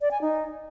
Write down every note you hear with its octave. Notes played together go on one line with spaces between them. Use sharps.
D5
G#5
D#4